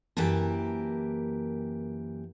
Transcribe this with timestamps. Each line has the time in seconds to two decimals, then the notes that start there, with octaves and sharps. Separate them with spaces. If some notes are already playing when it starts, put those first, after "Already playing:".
0.17 F#2 E3 A#3 G4 A#4 A5